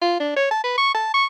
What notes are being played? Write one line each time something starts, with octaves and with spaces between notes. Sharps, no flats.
F4
D4
C#5
A5
B4
C#6
A5
C#6